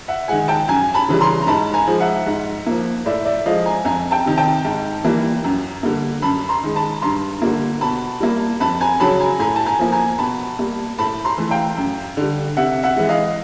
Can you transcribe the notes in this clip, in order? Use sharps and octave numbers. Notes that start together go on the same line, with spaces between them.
E5 F#5
D#3 G#3 F#5 G#5
G5 A5
F#2 G#5 A#5
A5 B5
C#3 E3 G3
A#5 C6
A#5
G#2 A5 B5
G#5 A#5
F3 G#3
E5 F#5
G#2
F3 A#3
A2 D5 E5
D5 E5
F3 G#3 D#5 F5
G#5 A#5
F2 G#5 A#5
G5 A5
C3 D#3
G5 A5
G#2
E3 G3 A#3
F#2
D3 G3 A#3
F#2 A5 B5
A#5 C6
D#3 G#3
A5 B5
G2 A#5 C6
D3 G3 A#3
B2 A5 B5
G3 A#3
F2 A5 B5
G#5 A#5
C#3 F#3 A5 B5
G#5 A#5
A2 G#5 A#5
A5
G#5 A#5
F3 A#3
G#5 A#5
B2 A5 B5
G3 A#3
A2 A5 B5
A#5 C6
E3 A3
F5 G5
F#2
D3 G3
C3 E5 F#5
E5 F#5
E3 G#3
D#5 F5